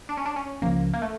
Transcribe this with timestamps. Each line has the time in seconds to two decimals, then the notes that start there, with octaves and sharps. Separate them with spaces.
0.09 D4
0.17 C#4
0.26 D4
0.36 C#4
0.62 C#2 C#3 F3 A#3 C#4
0.93 A#3
1.02 A3